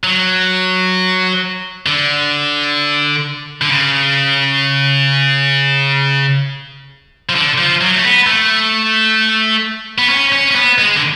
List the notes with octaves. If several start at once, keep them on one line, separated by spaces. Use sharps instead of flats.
F#3
D3
D3
C#3
F3
D3
F3
F#3
A3
B3
A3
B3
C#4
C#4
C#4
B3
G#3
D3